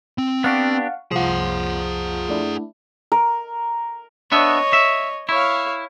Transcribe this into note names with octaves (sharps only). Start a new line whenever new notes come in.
C4
B3 D4 G4 F5 F#5 C#6
C2 F3 F4 G#4 F#5
A3 D4 E4
A#4
B3 D4 C#5 D#5 E5
E5
E4 C#5 F5